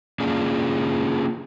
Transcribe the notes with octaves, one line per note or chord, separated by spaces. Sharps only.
A#3 C#4 D4 F4 G#4